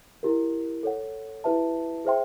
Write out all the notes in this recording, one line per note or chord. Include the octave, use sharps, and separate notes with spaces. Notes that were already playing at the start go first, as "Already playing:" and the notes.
E4 G4 A#4
A4 C#5 F#5
E4 G4 B4 E5 A5
G#4 C5 E5 G5 C6